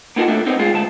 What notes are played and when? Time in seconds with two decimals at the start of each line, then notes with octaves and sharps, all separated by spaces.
0.16 A#3 B3 D#4 F4 F#4 A4
0.28 A2 D3 A3 A#3
0.46 A2 B3 C4 D#4
0.59 B1 G#3 F4 G#4
0.73 D2 G#3 A5